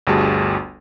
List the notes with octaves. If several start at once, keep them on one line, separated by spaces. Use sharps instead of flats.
G1 D2 G3 F#4 G#4 A5